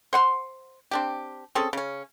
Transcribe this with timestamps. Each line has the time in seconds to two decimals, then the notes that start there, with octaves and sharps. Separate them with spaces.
0.13 C5 F#5 C6
0.91 C4 D4 G4
1.55 C4 C#4 G#4 A4
1.73 C#3 C#4